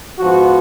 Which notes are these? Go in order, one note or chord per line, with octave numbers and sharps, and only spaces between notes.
G#2 F3 B3 F#4